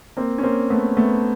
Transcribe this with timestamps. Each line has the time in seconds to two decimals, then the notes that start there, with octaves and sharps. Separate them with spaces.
0.17 A#3 C4
0.38 C#4
0.44 A#3 C4
0.70 A3 B3
0.97 A3 B3